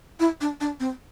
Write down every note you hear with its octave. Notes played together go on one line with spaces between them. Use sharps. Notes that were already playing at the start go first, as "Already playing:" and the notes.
E4
D4
D4
C4